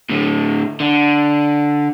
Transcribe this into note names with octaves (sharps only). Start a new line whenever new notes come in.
A2 D3
D3